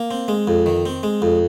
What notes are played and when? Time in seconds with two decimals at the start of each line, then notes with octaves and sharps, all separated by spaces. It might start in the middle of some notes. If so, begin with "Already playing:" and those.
Already playing: A#3
0.11 C4
0.28 G#3
0.47 F2
0.66 D#3
0.86 C4
1.03 G#3
1.22 F2